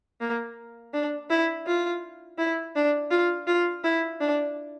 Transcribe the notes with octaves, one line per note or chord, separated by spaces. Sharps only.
A#3
D4
E4
F4
E4
D4
F4
F4
E4
D4